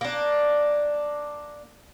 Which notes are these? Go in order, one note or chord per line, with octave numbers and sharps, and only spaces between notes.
A#3 D4